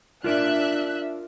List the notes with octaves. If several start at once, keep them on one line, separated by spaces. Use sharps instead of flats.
D4 F4 A#4 D5 E5 F#6